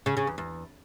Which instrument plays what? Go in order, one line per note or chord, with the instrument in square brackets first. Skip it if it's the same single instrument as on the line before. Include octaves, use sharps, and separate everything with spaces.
[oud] C#3
C#3
E2
E2